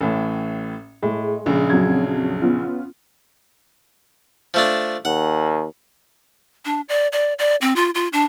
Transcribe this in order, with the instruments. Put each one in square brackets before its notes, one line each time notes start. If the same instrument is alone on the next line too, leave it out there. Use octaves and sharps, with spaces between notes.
[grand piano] A1 A2
[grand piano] A2 [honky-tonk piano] G#3
[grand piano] A#1 C#3
[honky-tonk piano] F2 F#3 G#6
B3 C#4 F4
[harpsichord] F3 A3 D4
[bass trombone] D#2 [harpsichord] F#5
[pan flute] D4
D5
D5
D5
C4
F4
F4
D4